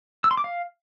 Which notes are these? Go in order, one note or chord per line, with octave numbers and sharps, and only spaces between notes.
E6
C6
D6
F5